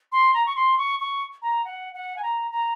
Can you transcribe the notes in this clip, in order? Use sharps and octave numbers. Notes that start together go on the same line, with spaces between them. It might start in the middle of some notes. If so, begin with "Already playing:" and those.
C6
A#5
C#6
C6
C#6
C#6
A#5
F#5
F#5
G#5
A#5
A#5